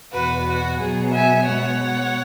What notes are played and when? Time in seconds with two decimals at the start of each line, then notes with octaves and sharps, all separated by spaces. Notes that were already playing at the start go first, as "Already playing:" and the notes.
0.13 E2 B2 B3 F#4 B4
0.46 F#4
0.79 B2 F#3 B3 G#4
1.13 E5 G#5
1.46 B2 G#3 B3 C#5 F#5